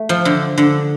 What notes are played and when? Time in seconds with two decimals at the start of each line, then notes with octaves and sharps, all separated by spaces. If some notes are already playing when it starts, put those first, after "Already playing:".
Already playing: A3
0.09 F3
0.25 D3
0.58 D3